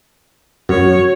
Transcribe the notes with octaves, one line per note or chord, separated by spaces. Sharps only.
F#2 F#4 C#5